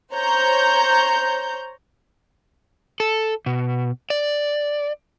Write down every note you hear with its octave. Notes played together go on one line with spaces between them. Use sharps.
C5 C#5 A#5 G6
A4
B2
D5